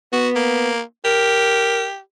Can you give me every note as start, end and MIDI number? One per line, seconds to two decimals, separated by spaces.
0.13 0.71 59
0.13 0.29 66
0.35 0.81 58
1.05 1.98 67
1.05 1.85 70